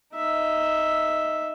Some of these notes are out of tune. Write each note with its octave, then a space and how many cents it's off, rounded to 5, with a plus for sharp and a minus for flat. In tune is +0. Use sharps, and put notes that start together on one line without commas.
D#4 +0 E5 +0